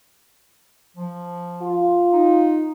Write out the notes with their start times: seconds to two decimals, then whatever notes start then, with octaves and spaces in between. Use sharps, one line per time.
0.97 F3
1.62 F4
2.13 D#4